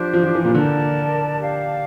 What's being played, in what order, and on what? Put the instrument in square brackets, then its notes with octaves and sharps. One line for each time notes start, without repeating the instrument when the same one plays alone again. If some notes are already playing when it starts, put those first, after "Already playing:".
Already playing: [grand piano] F3 [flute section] D4 G4 C5
[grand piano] F3
F3
E3
A#2
[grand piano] D3 [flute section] A#4 D5 A5
[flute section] G4 D5 F5